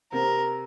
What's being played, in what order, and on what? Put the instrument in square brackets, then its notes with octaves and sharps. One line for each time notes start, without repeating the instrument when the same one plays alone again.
[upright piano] C3 C4 [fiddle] A#4